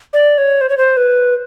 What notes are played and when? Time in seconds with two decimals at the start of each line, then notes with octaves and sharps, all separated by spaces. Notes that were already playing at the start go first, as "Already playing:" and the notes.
0.13 D5
0.38 C#5
0.61 C5
0.70 C#5
0.78 C5
0.97 B4